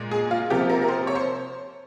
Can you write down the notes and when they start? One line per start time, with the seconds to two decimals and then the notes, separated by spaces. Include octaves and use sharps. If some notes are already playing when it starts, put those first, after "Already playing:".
Already playing: A#2 G#3
0.11 G#4
0.31 F4
0.50 C3 F3 A#3 G4
0.69 A#4
0.82 A#4
0.88 C5
1.07 C#5
1.15 C5